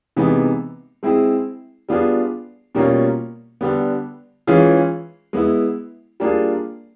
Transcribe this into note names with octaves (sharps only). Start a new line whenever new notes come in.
C3 E3 G#3 B3 D#4
G#3 C4 E4 G#4
G3 B3 D4 F4 G#4
B2 G3 A#3 C#4 F4
D3 G3 B3
E3 G#3 C#4 F4 G#4
G#3 B3 E4
G3 A#3 D4 F4 G#4